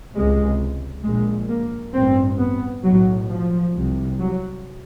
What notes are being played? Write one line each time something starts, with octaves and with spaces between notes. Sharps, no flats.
C#2 C3 G#3
A#1 A#2 G#3
A#3
A1 G2 C4
B3
B1 A2 F#3
F3
C2 C3
F#3